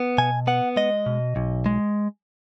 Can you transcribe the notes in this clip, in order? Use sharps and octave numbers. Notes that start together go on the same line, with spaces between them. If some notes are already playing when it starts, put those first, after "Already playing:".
Already playing: B3
B2 G#5
B3 F#5
G#3 D#5
B2
B1
G#3